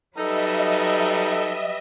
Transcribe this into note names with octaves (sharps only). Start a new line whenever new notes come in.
F#3 G3 D#4 A4 B4 D#5 E5